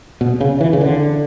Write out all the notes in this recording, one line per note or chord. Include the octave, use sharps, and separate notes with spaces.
B2
C#3
E3
C#3
D3